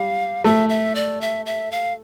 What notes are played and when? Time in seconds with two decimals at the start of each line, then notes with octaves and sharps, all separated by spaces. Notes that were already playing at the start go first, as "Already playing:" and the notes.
Already playing: G3 F5
0.44 A3 E5
0.69 E5
0.95 D5
1.21 E5
1.46 E5
1.71 F5